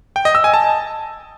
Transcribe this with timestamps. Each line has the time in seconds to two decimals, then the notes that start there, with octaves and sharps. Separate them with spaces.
0.16 G5
0.25 D#5
0.35 E6
0.44 G#5
0.54 A5